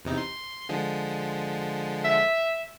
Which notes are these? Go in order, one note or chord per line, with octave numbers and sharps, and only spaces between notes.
E2 C3 D#4
C6
D3 F3 G#3
E5